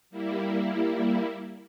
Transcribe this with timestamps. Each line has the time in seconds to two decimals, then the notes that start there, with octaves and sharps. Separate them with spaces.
0.10 G3 A#3 E4